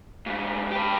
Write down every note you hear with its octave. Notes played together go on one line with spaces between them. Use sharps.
G#2 G3
G4 B4